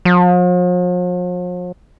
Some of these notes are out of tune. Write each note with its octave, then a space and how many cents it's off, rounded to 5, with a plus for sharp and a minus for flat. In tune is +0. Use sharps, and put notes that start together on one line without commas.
F3 +45